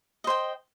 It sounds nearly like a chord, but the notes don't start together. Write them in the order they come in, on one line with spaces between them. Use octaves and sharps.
D#5 C5 G5